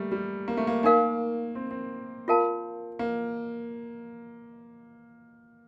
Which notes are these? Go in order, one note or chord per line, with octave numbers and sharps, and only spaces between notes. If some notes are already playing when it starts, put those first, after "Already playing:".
Already playing: G3 A3 A#3
G3
A#3
A3
A#3
A#3 D#4 A#4 F5
C4
C4
F4 A#4 F5 A5
A#3